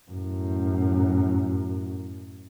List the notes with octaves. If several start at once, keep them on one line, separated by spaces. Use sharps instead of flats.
F#2 A2